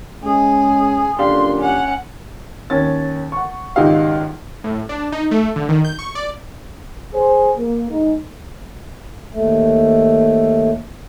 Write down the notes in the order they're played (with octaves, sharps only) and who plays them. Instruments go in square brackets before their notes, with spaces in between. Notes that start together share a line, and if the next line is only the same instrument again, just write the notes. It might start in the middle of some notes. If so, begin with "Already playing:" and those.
[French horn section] G#3 C#4 [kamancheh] G#4
[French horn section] F#2 A#2 D3 [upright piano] D4 G4 F5 [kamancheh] C6
[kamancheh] C#4 F#5
[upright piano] D#2 C#4 A6
F#5 C#6
G#1 C#2 D#4 F#4 G4 F5
[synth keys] A2
D4
D#4
A3
D3
D#3
G6
C#6
D5
[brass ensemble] G#4 C5
A#3
G#3 D#4
[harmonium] D#2 A3